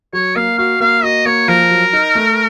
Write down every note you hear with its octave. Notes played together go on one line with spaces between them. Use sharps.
F#3 C#5
A#3 F5
F#4 F5
A#3 F5
F#4 D#5
A#3 C#5
F3 A#4
F#3
D#4
A3